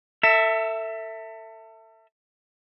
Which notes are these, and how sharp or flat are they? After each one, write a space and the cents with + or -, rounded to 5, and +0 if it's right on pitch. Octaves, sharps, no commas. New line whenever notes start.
A4 +30 E5 +0